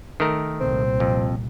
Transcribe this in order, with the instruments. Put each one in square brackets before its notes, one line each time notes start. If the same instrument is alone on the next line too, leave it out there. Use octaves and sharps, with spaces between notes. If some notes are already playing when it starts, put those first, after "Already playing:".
[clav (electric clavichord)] D#3 A3 A#4
[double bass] C2 A#2 [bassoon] C4
[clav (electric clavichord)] F2